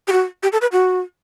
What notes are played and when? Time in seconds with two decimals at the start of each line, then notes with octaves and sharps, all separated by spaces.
0.08 G4
0.12 F#4
0.43 G4
0.52 A4
0.61 B4
0.72 F#4